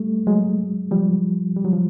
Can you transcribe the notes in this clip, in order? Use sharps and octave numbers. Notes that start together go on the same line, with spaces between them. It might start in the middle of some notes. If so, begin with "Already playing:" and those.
Already playing: G3 A3
F#3 G#3
F3 G3
G3
F#3
F3